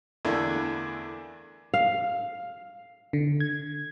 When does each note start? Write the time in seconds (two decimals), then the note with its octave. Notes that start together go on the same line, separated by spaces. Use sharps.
0.25 E2 D3 E3 A3 A#3 D4
1.74 F5
3.13 D3
3.40 G#6